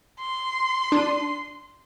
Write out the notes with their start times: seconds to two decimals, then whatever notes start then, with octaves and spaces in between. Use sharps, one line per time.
0.20 C6
0.92 D4 D#7